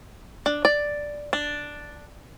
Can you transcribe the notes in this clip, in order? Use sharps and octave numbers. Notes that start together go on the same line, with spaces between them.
D4
D5
D4